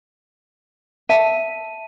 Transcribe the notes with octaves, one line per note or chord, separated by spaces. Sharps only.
E5 A5 D#7